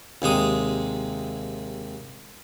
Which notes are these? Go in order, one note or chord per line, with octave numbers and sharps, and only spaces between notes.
D#2 C3 G#3 D#6